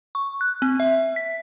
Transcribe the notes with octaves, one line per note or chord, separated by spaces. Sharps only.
C#6
F#6
C4
E5
B6